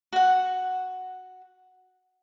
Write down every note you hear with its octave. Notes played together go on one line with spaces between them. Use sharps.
F#4 F#5